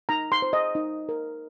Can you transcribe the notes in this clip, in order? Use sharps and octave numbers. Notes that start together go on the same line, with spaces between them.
D#4 A#5
C6
C5
D#5
D#4
A#4